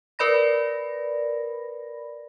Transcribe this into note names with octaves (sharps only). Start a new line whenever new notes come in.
A#4 B4 D5 B5 A#6